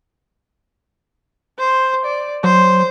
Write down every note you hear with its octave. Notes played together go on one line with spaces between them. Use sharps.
C5
D5
F#3 C5